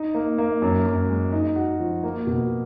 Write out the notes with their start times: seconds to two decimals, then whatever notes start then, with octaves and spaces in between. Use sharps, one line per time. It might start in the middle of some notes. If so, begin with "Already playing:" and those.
Already playing: D#4
0.14 A#3
0.38 A#3
0.62 F#2
0.86 F#2
1.09 G#3
1.32 D#4
1.56 F#4
1.80 F3
2.03 A#3
2.27 B2